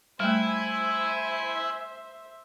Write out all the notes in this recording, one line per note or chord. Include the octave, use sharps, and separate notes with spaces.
G3 A3 E4 C5 E5 G#5